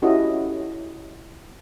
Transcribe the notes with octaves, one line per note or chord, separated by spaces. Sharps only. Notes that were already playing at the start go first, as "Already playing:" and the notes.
C#4 E4 F#4 G4 A4 D#5